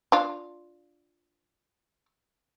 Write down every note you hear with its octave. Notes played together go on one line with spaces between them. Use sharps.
D4 F4